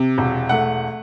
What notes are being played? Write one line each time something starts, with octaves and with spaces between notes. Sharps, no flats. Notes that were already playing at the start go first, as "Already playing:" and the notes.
Already playing: C3
E1
A3 F#5